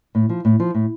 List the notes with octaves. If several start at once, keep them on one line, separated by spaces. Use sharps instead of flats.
A2
F3
A2
F3
A2